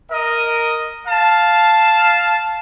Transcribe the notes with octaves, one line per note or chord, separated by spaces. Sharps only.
A#4 D#5
F5 A5